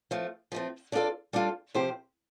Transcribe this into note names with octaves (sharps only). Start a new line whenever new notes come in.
F3 A3 C4
F3 A3 C4
G3 D4 F4 A4 D5
G3 D4 F4 A4 D5
C3 F3 C4 G4 C5